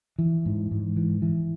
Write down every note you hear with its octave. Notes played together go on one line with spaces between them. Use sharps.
E3
G#2
G#2
E3
E3